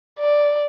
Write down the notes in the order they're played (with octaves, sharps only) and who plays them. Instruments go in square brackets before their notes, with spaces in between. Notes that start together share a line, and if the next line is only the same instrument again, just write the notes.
[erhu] D5